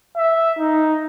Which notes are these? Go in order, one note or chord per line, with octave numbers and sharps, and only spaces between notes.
E5
D#4